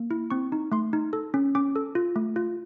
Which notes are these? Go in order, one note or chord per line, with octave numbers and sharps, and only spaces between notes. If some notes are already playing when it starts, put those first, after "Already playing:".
Already playing: A#3
E4
C4 C#6
D#4
A3 C6
D#4
A4
C#4
C#4 D6
A4
F4
A3
F4